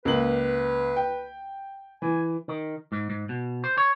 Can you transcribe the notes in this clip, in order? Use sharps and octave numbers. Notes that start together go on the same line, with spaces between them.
C#2 A#3 B4 F#7
G5
E3 G#5
D#3
G#2
G#2
B2
C5
C#5